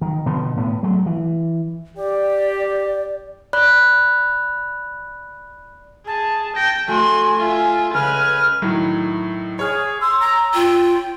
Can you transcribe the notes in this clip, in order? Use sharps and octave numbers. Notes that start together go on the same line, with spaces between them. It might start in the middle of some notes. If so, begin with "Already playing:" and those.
D#3
B2 D3 F3
A2 B3
F#3 G#3 A3
E3
G4 D5
D5 B5 F#6
G#4 A5
G5 A#6
A3 F#4 G#5 C6
F4 E5
C#2 B4 G#5 F6
A2 D#3 F#3
G#4 C#5 F6
C6 E6
A#5
F4 G5